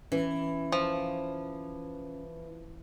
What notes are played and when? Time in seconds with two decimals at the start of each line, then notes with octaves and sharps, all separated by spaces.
0.12 E3 C#4
0.72 F3